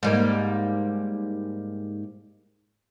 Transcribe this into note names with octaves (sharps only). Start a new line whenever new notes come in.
G#2 G3 A#3